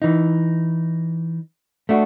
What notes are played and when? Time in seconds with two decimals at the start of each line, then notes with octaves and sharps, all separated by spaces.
0.02 E3 D#4
1.89 A3 D4 F#4